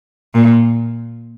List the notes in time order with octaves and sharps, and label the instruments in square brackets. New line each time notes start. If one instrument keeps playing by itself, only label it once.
[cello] A#2